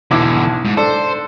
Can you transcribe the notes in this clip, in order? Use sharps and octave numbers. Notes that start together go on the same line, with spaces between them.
B1 E2 D3 E4 D6
G#2
D4 A4 C5